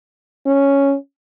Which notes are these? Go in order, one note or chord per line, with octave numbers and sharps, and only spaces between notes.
C#4